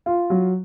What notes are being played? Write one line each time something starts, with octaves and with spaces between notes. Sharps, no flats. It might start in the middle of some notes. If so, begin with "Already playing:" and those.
F4
F#3